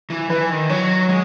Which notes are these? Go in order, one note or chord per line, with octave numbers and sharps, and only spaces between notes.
E3
E3 B4
D#3
F#3 C#5
G#3